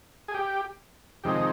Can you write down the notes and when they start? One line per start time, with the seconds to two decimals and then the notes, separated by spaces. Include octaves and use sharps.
0.28 G#4
0.34 G4
1.24 F2 C3 D#3 G#3 D#4 G4